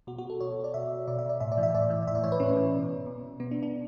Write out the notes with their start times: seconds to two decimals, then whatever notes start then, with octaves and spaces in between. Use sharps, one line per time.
0.07 B2 F#4
0.18 F#4
0.30 A4
0.40 B2 C#5
0.64 D5
0.74 B2 E5
1.08 B2 D5
1.19 E5
1.29 D5
1.40 A2 E5
1.52 D5
1.58 E3
1.63 E5
1.75 A2 D5
1.90 E3
2.07 A2 E5
2.15 D5
2.24 E3 C#5
2.32 B4
2.40 A2 C#4
2.57 E3
2.74 B2
3.06 B2
3.40 B2 B3
3.51 D4
3.63 D4